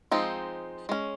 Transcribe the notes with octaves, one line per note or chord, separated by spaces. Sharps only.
F3 G#3 C4 D#4
G#3 C#4